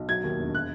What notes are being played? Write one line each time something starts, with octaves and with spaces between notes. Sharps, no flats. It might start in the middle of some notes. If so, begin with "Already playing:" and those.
Already playing: B1
F#3 G#6
D#2
E1
F#6